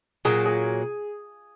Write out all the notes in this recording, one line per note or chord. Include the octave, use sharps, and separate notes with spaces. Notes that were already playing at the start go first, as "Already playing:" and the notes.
A#2 F#3 A#3 G#4
G#4